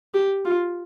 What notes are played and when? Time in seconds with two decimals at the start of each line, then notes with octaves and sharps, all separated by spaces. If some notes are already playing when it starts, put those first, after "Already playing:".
0.14 G4
0.45 F4